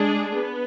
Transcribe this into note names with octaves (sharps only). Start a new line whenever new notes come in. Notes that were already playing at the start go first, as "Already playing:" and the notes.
Already playing: G#3 D4 G#4
B3